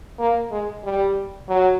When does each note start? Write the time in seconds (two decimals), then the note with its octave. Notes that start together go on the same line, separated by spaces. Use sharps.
0.19 A#3
0.52 G#3
0.84 G3
1.48 F#3